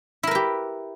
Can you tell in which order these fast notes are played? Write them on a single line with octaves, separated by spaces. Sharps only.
E4 A#4 B4 G4